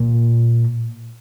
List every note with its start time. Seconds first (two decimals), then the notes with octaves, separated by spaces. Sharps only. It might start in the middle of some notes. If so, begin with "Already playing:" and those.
Already playing: A#2